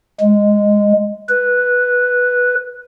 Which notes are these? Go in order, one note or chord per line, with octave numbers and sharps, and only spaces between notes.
G#3
B4